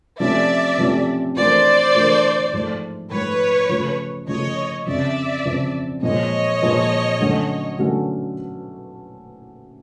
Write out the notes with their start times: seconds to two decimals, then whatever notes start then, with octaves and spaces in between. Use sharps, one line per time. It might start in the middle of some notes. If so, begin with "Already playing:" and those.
0.19 C3 F3 A3 C#4 F4 D5 E5
0.78 C3 F3 A3 C#4 F4
1.36 E3 A3 D4 F4 A#4 C5 D5
1.95 E3 A3 D4 F4 A#4
2.53 G#2 F3 A3
3.11 G#2 F3 A3 B4 C#5
3.69 C#3 F3 A3 C#4 F4
4.28 C#3 F3 A3 C#4 F4 C#5 D#5
4.87 F2 C#3 F3 D5 E5
5.45 F2 C#3 F3
6.03 A#2 F3 G#3 C#5 D#5
6.62 A#2 F3 G#3
7.20 D3 F#3 A3 C#4 F#4
7.78 D3 F#3 A3 C#4 F#4